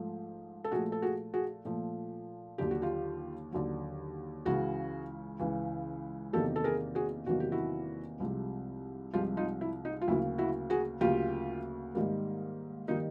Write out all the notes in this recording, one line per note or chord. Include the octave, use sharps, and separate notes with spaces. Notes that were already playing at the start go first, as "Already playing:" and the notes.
Already playing: G#2 F3 A3
A4
A#2 F3 A3 F#4 G#4
A4
F#4 G#4
F#4 G#4
A#2 F3 A3
D#2 D3 F#3 G4
F#4
F4 G4
D#2 D3 F#3
C#2 C#3 E3 F#4 G#4
C#2 C#3 E3
E2 C3 D#3 F#3 A#3 G4 A4
A4
G#4 A#4
F#4 G#4
E2 C3 D#3 F#3 A#3 F#4
G4
E4 F#4
C2 C3 F3 G#3
C2 C3 F3 G#3 F4 G4
D#4 F4
E4
D#4
F4
D2 C#3 F#3 A#3 E4
E4 F#4
F#4 G#4
D2 C#3 F#3 A#3 F4 G4
G#2 D#3 G3 A#3
D#3 G3 A#3 D#4